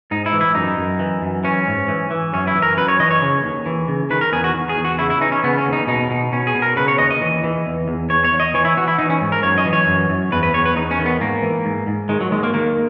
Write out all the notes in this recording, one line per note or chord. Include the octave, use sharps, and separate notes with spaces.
G#2 D#4
E4
E3
E4
F#2 D#4
F#2
E3
F#2
E3 C#4
G#2
E3
E3
F#2 C#4
E4
E3
A#4
F#2 B4
C#5
E3 D#5
C#5
C#3
D#2
E3
C#3
D#3 B4
A#4
E2 G#4
F#4
E2
G#4
E2
F#4
C#3 E4
E4
E3 D#4
C#4
C#3 B3
C#4
D#2
D#4
B2 D#4
B2
B2 C#4
G#4
B2
A#4
C#3 B4
C#5
D#2 D#5
D#5
E3
E3
E2
E2
E2 C#5
C#5
E2
D#5
E3 C#5
E4
E3 F#4
E4
E3 D#4
C#4
G#2
A#4
F#2 C#5
D#5
E3
C#5
F#2
F#2
E2 B4
B4
E2 C#5
B4
E2 D#4
C#4
D#3
B3
G#2 A#3
E3
G#2
G#2
D#3 G#3
F#3
D#2 G#3
A#3
D#3 A#3